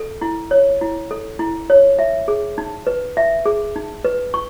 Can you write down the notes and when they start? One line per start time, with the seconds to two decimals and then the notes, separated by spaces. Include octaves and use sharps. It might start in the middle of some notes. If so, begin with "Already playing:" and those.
Already playing: A4
0.22 E4
0.51 C#5
0.81 E4
1.11 A4
1.39 E4
1.70 C#5
1.99 E5
2.28 G#4
2.58 D#4
2.87 B4
3.17 E5
3.46 G#4
3.76 D#4
4.05 B4
4.34 C#6